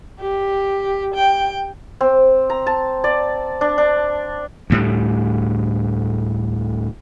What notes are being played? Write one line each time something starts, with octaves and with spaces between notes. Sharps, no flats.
G4
G5
C4
A#5
A5
D5
D4
D4
D2 A2 G3